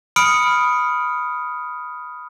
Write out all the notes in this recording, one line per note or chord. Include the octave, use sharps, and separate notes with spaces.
B5 D#6 F6 C#7 D7